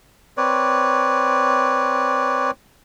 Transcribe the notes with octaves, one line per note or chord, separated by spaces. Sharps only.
C4 B4 C#5 D5